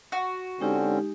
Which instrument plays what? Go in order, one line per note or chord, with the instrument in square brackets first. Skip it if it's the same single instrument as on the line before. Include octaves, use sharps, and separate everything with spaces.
[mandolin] F#4
[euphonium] D3 [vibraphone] G#3 D#4 G4 [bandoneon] C4 C#4